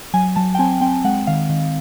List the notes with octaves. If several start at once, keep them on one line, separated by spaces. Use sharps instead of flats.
F#3 G#5
F#3 A5
G5
C4 G#5
C4 G5
G#3 F#5
D#3 F5
D#3